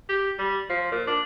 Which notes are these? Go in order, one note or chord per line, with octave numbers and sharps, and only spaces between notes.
G4
G3
F3
A#2
D4